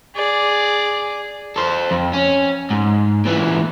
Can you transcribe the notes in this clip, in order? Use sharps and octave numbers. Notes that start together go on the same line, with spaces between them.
G#4 D5
A4 C5
F2
C#4
G#2
A#2 E3